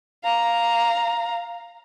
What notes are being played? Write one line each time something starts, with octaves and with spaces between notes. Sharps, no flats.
F5 A#5